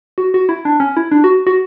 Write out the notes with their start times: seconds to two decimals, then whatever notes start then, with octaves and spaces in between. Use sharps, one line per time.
0.18 F#4
0.34 F#4
0.49 E4
0.65 D4
0.80 C#4
0.97 E4
1.11 D4
1.24 F#4
1.47 F#4